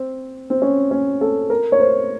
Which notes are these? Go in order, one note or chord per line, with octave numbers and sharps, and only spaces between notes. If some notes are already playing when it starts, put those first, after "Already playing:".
Already playing: C4
C4
C#4
C#4
A4
A#4
C#5
C5